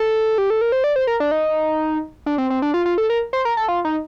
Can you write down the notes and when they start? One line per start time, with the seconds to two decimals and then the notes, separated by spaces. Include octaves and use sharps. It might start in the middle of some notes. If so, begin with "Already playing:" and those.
Already playing: A4
0.38 G4
0.50 A4
0.61 A#4
0.72 C5
0.84 D5
0.96 C5
1.07 A#4
1.20 D4
1.31 D#4
2.26 D4
2.38 C4
2.50 C4
2.62 D4
2.74 F4
2.86 F4
2.98 A4
3.10 A#4
3.33 C5
3.45 A#4
3.57 A4
3.68 F4
3.85 D#4